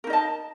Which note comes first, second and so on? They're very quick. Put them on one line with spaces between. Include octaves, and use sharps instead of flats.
A#4 D#4 D#5 A5